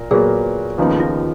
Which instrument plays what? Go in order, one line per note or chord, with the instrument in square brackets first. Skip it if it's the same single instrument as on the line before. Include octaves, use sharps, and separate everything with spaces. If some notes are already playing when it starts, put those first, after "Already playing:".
Already playing: [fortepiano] A#2 A#4
[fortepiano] A#2 F#3 B3 F#4 A#4 [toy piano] G#4
[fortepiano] D#2 C#3 F3 B3 D#4
[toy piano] F4